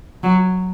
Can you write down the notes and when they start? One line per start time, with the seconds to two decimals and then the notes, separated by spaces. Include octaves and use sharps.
0.23 F#3